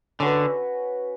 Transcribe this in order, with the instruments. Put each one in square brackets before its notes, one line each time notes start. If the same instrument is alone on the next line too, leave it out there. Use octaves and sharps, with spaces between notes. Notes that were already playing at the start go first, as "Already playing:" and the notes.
[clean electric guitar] D3 [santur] C#4 F#4 B4